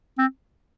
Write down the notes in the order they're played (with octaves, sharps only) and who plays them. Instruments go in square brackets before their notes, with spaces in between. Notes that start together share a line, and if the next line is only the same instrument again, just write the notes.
[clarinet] C4